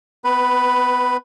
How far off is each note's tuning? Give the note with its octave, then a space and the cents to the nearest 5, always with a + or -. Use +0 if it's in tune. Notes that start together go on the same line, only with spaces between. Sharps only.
B3 +30 B4 +0